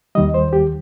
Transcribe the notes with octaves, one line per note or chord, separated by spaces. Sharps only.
D#2 D#3 G3 D#5
C5
G4